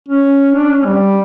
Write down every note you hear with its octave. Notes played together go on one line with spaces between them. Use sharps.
C#4
D4
C#4
G3